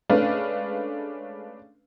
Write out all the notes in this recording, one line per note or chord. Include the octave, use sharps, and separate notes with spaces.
G#3 A3 C#4 D4 B4 F5